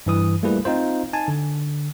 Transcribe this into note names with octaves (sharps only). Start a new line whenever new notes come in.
G2 E3 D#6
G3 A3 A#3 E4 G#4 B4
C4 D#4 F4 C5
D#4 G#5 A5
D3